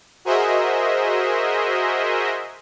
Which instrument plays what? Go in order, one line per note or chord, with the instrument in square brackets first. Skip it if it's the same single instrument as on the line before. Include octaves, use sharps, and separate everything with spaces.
[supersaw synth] F#4 G#4 A#4 C5 D#5 E5